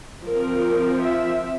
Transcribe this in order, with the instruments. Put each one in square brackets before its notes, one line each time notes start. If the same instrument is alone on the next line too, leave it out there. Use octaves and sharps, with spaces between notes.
[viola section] F3 C4 A#4
E5